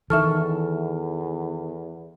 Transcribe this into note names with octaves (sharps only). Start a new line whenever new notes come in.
E2 D#3 E3 A4 E5 C#6 F6